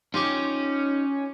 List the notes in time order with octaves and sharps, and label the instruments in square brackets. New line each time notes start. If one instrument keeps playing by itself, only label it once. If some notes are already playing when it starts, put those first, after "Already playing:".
[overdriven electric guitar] C#4 [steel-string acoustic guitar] D#4 [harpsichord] F4 G4 C#5